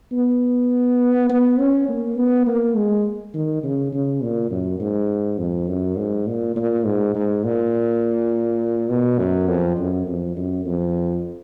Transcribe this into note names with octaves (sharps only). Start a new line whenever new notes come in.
B3
B3
C#4
A#3
B3
A#3
G#3
D#3
C#3
C#3
A#2
F#2
G#2
F2
F#2
G#2
A#2
A#2
G#2
G#2
A#2
B2
F#2
F2
F#2
F2
F#2
F2